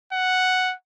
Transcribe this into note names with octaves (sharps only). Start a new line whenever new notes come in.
F#5